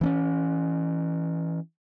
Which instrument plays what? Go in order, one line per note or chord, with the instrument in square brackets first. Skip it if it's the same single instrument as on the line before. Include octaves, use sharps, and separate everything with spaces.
[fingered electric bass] E3 C4 C#4